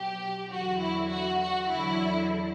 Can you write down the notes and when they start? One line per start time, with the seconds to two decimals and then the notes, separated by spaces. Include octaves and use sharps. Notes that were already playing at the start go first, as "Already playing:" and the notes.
Already playing: B2 F#3 G4
0.51 E2 D3 F#3 F#4
0.82 E4
1.11 F#4
1.41 F#4
1.71 E2 D3 F#3 E4